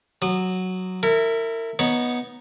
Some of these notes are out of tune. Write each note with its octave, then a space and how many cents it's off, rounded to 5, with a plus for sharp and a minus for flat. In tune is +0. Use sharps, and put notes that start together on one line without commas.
F#3 +0 D#6 -35
E4 +0 A#4 -35
B3 -10 D#4 +0 C#5 +0